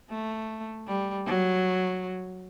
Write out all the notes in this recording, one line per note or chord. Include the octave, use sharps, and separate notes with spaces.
A3
G3
F#3